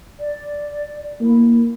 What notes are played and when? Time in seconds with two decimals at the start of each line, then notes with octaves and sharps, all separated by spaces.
0.19 D5
1.20 A#3 E4